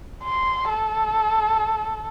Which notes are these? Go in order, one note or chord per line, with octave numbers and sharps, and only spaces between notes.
C6
A4